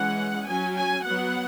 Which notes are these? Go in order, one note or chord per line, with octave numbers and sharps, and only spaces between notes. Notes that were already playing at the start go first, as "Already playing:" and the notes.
Already playing: E3 G#3 C#4 F#5
F#3 C#4 G#5
G#5
F#3 B3 F#5